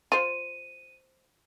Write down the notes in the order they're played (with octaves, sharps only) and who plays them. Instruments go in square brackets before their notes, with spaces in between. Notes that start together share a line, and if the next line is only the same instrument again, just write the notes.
[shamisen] F4 C5 [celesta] D#7